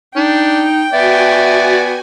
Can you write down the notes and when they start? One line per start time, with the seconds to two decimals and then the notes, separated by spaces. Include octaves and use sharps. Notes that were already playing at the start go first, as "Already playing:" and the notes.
0.16 D4 D#4 G5
0.93 B3 F#4 D5 E5 G#5